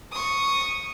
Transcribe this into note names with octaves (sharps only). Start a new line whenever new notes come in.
C#6 D#6